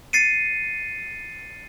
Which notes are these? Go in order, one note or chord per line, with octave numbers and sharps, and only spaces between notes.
A6 C7 C#7 D#7